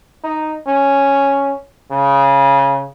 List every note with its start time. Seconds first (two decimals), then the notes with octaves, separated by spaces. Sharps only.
0.24 D#4
0.67 C#4
1.91 C#3